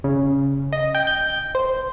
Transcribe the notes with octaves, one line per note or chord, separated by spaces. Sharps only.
C#3
D#5
G5
G6
C5